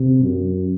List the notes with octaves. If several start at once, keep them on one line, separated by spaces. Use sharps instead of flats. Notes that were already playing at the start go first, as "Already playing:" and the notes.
Already playing: C3
F#2